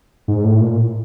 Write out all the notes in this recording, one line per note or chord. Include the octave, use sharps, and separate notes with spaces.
G#2
A2
A#2